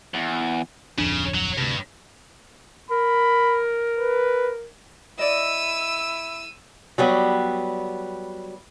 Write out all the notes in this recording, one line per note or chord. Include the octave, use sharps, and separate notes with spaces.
E2
D1 F2 C#3 D4
F#3
D2 G2 C3
A#4 B5
B4
E4 D5 D#5 E6 D#7
F#3 G3 B3